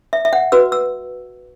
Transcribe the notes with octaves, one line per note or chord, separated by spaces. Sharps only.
E5
E5
F#5
F#4 B4 E6
E6